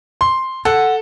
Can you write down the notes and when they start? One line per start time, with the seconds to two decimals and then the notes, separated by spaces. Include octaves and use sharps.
0.21 C6
0.65 A4 F#5